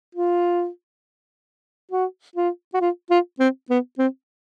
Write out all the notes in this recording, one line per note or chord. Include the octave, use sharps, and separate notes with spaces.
F4
F#4
F4
F#4
F4
F4
C4
B3
C4